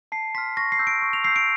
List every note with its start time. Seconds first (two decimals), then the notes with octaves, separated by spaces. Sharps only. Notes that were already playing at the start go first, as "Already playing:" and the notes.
0.12 A5 C7
0.35 C6 F6 B6
0.57 C#6 A#6
0.72 C7
0.79 E6 G6
0.87 D7
1.02 C#6
1.13 F7
1.24 E6 G6 C7
1.36 D7